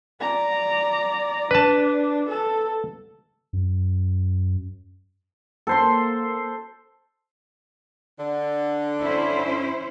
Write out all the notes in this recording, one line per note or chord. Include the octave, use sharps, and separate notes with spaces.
D5 A#5
D4 B4 A5
A4
F#2
A#3 A4 C5 C6
D3
C#4 E4 C5